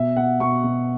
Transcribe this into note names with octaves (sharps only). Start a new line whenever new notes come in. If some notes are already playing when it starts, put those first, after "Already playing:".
Already playing: B2 E5
B2 F#5
B2 C#6
B2